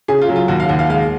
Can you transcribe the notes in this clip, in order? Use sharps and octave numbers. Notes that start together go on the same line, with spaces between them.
C#3 G#4
F4
F#3
F4
D#2 F#4
F5
D#2 F#5
F5
G#3 F5